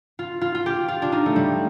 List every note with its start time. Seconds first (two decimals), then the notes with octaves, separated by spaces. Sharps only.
0.19 F4
0.41 F4
0.55 F4
0.66 G4
0.88 F4
1.02 D4
1.12 D#4
1.26 A3
1.36 G3